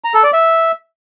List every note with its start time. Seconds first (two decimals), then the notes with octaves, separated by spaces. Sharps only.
0.04 A#5
0.14 A4
0.24 D5
0.33 E5